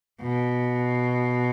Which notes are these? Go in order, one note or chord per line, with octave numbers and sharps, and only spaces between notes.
B2